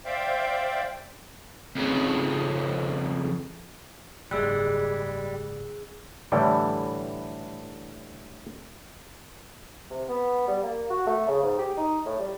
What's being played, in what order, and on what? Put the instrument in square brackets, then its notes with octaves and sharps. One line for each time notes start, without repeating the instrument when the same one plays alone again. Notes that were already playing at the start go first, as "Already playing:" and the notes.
[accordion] C5 D5 E5 F5 G5
[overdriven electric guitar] F2 C#3
[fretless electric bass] F#1 G#2 [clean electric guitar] G3 G#3 [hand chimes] G#4 E6 F#6
[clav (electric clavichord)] A2 D3 E3 G3 G5
[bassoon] C3
B3
G3
A#3
F#4
A3
C#3
G#2
G4
D#4
A2
G3